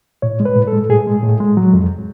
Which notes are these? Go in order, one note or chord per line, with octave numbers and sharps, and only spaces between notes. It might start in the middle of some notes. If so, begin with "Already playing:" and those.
A2 C#5
G#3
B4
A2
A4
G#3
A2 G#4
G#3
A2
G#3
F#3
F2